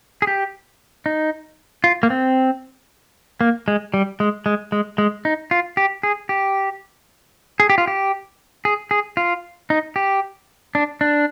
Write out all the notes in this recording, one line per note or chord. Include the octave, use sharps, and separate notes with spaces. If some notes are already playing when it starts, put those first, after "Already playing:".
G#4
G4
D#4
F4
A#3
C4
A#3
G#3
G3
G#3
G#3
G#3
G#3
D#4
F4
G4
G#4
G4
G#4
G4
F4
G4
G#4
G#4
F4
D#4
G4
D4
D4